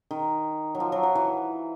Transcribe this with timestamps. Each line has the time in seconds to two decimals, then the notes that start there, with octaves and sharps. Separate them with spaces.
0.11 D#3
0.75 F#3
0.80 F3
0.92 F#3
1.03 F#3
1.15 E3